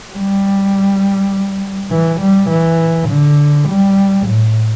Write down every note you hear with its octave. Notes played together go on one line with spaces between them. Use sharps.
G3
E3
G3
E3
D3
G3
A2